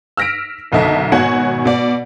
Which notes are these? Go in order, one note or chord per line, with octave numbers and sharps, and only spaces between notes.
E6 F6 A#6 B6 D7
F#1 B1 D3 D#5 E5 A5
G#1 B2 F#4 C#5 F#5 G#5
B2 D5